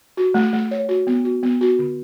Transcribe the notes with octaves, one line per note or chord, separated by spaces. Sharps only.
F#4
A3
A3
C#5
F#4
B3
F#4
B3
F#4
D3